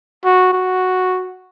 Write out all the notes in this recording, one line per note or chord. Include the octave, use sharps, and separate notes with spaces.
F#4
F#4